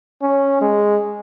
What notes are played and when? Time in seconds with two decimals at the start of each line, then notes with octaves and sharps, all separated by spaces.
0.22 C#4
0.61 G#3